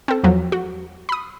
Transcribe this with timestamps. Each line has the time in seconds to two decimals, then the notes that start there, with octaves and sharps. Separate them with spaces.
0.08 C4 A4
0.24 E2 F3 F#3
0.52 F#4
1.09 B5 D#6